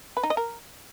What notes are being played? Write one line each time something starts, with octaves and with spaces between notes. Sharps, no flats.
B4
D#4
D#5
A#4